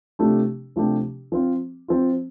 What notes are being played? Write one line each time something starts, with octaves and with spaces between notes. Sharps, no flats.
C3 F3 A3 D4 G4
C3 F3 A3 D4 G4
F3 C4 F4
F3 C4 F4